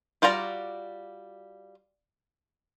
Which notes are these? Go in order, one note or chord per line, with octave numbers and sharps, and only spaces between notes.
G3 F4 F#4 D5 A#5